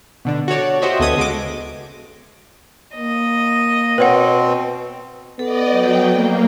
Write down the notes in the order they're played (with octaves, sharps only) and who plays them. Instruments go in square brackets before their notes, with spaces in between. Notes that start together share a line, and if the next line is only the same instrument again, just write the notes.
[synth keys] B2 D3 D4
F#4 A4 C#5 D5
F#4 G4 C5 D#5 E5
D2 B3 A4 D#5 D#6 G#6
C#3 G#3 F#4 D6
[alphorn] A#3 [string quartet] D#5
[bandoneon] B2 C4 [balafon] B4 C#5 F#5
[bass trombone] B3 [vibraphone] A4 [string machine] D5 D#5
[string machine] F#3 G5
A#3